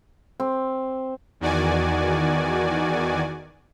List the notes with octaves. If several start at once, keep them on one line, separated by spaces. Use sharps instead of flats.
C4
E2 D#3 F#4 D5 G#5